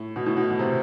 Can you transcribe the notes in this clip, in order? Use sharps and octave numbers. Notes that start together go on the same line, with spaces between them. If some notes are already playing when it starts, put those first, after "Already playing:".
Already playing: A2
B2
A2
B2
B2
C3